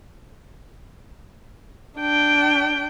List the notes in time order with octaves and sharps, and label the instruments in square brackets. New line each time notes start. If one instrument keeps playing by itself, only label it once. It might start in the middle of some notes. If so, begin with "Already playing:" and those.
[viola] D4 G5